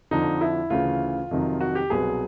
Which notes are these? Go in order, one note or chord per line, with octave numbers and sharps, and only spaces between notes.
F2 D3 F3 D#4
E4
D2 C#3 E3 F4
F2 C3 D#3 F#3
F#4
G4
C2 B2 F#3 G#4